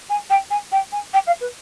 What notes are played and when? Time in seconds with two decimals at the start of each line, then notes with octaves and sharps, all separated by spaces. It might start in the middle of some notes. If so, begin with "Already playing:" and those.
0.09 G#5
0.30 G5
0.50 G#5
0.72 G5
0.92 G#5
1.13 G5
1.27 F5
1.40 B4